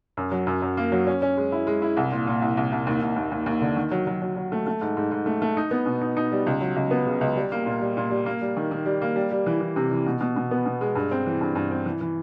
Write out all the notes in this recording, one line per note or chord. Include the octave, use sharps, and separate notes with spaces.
F#2
F#3
F#2
F#2
A#3
F#3
C#4
C#4
G#3
E4
G#3
E4
C2
A#2
A#2
C2
C2
C2
D#2
D#2
D#2
D#2
D#2
D3
D#3
F#3
F#3
F#3
F#3
A3
A3
G#2
G#2
G#2
A3
A3
D#4
B3
B2
D#4
D#4
G3
C#2
F#3
C#2
B3
C#3
C#2
G3
A#3
A#2
G3
A#2
G3
A#3
G3
D#3
D#3
G3
A#3
G3
G3
E3
E3
C3
E3
B2
B2
B2
B3
B2
G#3
G2
C4
E3
G2
G2
C4
E3
E3